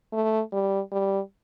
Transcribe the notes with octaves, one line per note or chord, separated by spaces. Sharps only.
A3
G3
G3